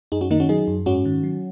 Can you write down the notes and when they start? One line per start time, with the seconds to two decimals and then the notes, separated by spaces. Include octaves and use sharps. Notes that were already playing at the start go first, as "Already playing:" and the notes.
0.12 F#2 D#4 G#4
0.21 C#4 F#4
0.30 D#3 A#3 D#4
0.40 C#4 F#4
0.49 F#3 D#4 G#4
0.68 F#2
0.86 G#2 C#4 F#4
1.05 D#3
1.23 F#3